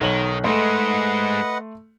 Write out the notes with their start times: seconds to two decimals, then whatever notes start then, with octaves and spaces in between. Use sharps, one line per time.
0.01 B1 D#3 C#5 A#5 F#7
0.44 G#2 G#3 A3 B4 D#5 F#5 C6